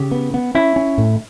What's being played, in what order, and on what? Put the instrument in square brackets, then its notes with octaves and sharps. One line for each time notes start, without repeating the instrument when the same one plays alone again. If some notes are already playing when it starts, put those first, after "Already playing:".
Already playing: [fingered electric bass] C#3 [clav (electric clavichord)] G4
[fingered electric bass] B3
B3
[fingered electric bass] C#4 [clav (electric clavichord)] E4
[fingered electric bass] C#4
A2